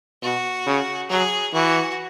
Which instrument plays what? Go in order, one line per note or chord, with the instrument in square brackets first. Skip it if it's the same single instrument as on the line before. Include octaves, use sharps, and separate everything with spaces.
[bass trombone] B2 [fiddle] F#4
[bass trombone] C#3
[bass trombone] F#3 [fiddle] G#4
[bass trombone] E3 [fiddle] F#4